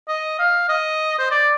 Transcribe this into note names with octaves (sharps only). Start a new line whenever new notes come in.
D#5
F5
D#5
C5
D5